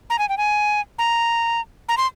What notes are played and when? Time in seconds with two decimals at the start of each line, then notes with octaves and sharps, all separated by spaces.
0.10 A#5
0.19 G#5
0.29 G5
0.38 G#5
0.99 A#5
1.89 A#5
1.97 C6